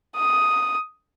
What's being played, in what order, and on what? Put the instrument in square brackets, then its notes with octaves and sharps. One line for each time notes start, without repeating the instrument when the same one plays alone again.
[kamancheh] D#6